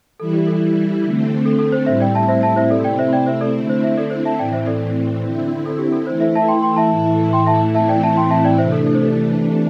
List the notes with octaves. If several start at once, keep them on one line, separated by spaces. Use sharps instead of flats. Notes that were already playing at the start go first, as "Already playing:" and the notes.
E3 G3 E4 A4
G4
A4
D3 A3 C4
A4
A4
C5
A2 G3 C4 E4 C5 E5
D5 G5
E5 A5
C5 E5
E5 A5
C5 E5
C3 A3 C4 E4 A4 D5
D5 G5
C5 E5
D5 G5
C5 E5
A4 D5
D3 A3 C4 E4
C5
C5 E5
A4 D5
C5
E5 A5
A2 E3 C4 D5 G5
C5 E5
A4 D5
D3 C4 E4
A4
G4
A4
E3 A3 E4 C5
C5 E5
E5 A5
G5 C6
G5 C6
E5 A5
A2 E3 A3 E4
G5 C6
E5 A5
A2 E3 A3 C4 E4 E5 A5
D5 G5
E5 A5
G5 C6
E5 A5
D5 G5
C3 E3 A3 D4 C5 E5
A4
A4
C5
A4